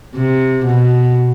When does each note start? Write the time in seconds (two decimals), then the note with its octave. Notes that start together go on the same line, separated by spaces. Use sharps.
0.16 C3
0.65 B2